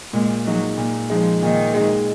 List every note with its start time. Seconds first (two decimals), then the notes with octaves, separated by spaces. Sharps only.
0.13 A#2 G#3
0.45 F#3 G#3 D#4
0.78 A#2
1.09 F3 G#3 D#4
1.42 A#2 D#3
1.74 G#3 D#4